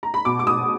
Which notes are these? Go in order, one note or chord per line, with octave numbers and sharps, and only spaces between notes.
A#5
B5
B2 D6
D6
B2 D#6